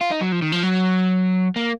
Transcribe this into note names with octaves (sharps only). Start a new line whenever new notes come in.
F4
D#4
F#3
F3
D#3
F3
F#3
A#3